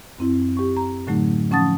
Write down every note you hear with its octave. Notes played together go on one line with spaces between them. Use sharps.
F#2 C4 E4
G4 C#6
A#5
A2 D3 F#3 A3 D#4
F3 C#4 F#5 A5 D#6 A6